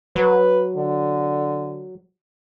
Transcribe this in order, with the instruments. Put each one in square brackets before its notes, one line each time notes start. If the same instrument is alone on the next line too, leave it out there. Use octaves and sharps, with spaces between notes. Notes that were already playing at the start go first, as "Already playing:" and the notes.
[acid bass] F#3 [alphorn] B4
[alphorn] D3